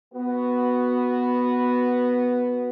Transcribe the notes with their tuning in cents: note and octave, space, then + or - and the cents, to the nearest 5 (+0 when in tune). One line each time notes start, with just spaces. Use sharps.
B3 +0 F#4 +0